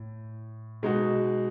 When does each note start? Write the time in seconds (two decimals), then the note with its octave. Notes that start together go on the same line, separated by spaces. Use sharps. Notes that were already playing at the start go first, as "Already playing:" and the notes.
Already playing: A2
0.83 B2 G#3 D#4 F#4